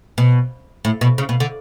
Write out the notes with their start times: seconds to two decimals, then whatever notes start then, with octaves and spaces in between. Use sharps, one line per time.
0.18 B2
0.85 A2
1.01 B2
1.18 C#3
1.29 B2
1.40 D3